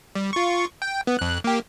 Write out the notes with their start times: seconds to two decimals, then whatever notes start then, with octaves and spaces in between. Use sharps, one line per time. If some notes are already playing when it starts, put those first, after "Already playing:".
0.15 G3
0.33 F4 C#6
0.82 G5
1.07 B3
1.19 F2 F#6
1.44 A#3 G4